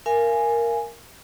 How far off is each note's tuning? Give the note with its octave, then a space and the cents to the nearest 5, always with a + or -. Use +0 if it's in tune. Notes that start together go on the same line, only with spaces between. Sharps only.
A#4 +0 F5 -40 G#5 +0